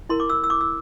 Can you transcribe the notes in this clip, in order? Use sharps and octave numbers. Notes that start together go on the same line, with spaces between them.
E4 A#4 C6
D6
E6
E6
D6
E6